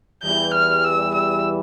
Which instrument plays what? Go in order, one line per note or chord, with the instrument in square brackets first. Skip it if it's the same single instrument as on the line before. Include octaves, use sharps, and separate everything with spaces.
[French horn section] E2 E3 G3 [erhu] G6
[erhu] F6
E6
E6